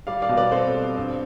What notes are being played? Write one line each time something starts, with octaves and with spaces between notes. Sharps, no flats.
G3 D5 F5
D5 F5
B2
B4 D5
C4 A4 C5
G3
G2